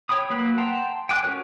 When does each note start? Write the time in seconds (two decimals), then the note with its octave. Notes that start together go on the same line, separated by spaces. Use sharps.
0.09 C#5 G5 B5 D#6
0.30 F#3 A#3 B4 B5 F#6
0.58 F#5 G5 A5 A#5 C6
1.09 G5 G#5 D6 F#6
1.23 C#4 F#4 A#4 C#5